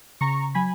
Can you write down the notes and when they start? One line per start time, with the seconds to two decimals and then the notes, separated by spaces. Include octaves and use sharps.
0.21 C#3 A#5 C#6
0.55 F#3 G#5 B5